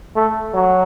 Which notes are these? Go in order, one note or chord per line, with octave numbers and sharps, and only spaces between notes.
A3
F#3